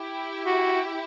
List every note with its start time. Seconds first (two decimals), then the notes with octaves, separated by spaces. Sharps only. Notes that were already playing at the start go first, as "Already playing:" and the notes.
Already playing: E4 G4
0.46 F#4